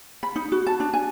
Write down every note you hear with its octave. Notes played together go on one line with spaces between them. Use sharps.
B5
D#4
F#4
A5
D4
G#5